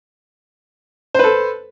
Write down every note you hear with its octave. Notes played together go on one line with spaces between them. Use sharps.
A4 B4 C5